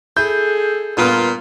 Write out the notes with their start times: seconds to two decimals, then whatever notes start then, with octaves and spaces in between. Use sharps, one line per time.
0.17 E4 G#4 A4 G6
0.97 G2 A#2 B3 F4